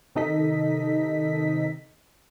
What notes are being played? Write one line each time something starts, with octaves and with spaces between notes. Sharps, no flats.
C3 D#3 D#4 A4 D#5 B6